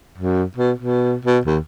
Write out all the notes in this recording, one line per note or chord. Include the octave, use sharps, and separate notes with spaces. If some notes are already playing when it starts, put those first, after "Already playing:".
F#2
B2
B2
B2
D#2